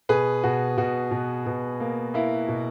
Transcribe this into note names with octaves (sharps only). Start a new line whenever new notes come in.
B2 G#4 B4
B2 F#4
B2 F#4
B2
B2
A#3
A#3 E4
B2